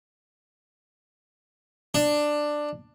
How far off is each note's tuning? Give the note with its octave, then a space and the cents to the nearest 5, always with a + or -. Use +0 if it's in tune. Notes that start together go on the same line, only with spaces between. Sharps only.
D4 +10